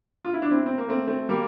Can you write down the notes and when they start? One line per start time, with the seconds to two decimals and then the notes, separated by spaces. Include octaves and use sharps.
0.25 F4
0.33 E4
0.42 D4
0.50 C4 E4
0.66 C4
0.78 A#3
0.89 A3 C4
1.07 A3 C4
1.29 G3 A#3